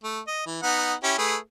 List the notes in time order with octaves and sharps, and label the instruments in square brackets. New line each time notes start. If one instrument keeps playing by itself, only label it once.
[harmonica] A3
D#5
E3
B3 D#4 F#5
C#4 E4 G4
A3 G#4 B4